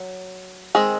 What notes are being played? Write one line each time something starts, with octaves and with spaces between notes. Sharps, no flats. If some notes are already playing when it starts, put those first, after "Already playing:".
Already playing: F#3
D#3 G#3 C4 G#4